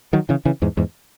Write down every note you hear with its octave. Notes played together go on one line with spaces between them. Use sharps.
D#3 F#3
C#3 E3
C#3 E3
E2 G#2
E2 G#2